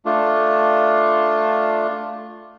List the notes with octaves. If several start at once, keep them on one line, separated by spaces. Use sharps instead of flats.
A3 D4 F4